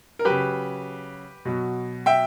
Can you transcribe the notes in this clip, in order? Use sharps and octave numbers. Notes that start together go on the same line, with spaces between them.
A#4
C#3 F#3 G4 B4
B2 F#3
E5 G5